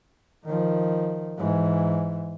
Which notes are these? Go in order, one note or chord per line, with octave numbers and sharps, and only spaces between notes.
D#3 F3
G#2 E3